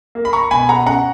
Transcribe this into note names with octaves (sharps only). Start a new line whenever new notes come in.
A#3
B5
A#5 C#6
B2 G#5 B5
F#5 A#5
C#4 F#5 A#5